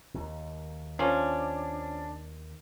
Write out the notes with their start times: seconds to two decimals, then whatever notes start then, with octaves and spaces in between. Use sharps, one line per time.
0.14 D#2 D#3
0.99 F3 C#4 D4